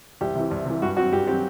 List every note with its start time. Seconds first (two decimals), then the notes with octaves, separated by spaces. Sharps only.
0.21 C2 G4
0.35 C3 E3
0.51 C2
0.66 C3 E3
0.82 G2 F#4
0.97 F#3 C4 F#4
1.12 G2 G4
1.27 F#3 C4 G4